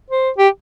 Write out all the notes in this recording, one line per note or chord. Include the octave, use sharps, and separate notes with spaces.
C5
G4